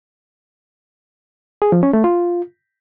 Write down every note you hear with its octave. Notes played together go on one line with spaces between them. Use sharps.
G#4
F3
C#4
A3
F4